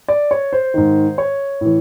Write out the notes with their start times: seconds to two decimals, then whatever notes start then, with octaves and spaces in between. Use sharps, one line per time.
0.08 D5
0.31 C#5
0.53 C5
0.74 G#2 D#3
1.18 C#5
1.61 A2 E3